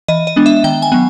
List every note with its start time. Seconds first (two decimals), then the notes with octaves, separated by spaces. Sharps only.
0.08 E3 D#5
0.27 D#5
0.36 G#3 B3 D4
0.46 E5
0.64 D#3 G5
0.82 G#5
0.92 F#3 B3